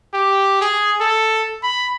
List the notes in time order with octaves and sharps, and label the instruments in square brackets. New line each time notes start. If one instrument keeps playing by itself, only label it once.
[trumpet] G4
G#4
A4
B5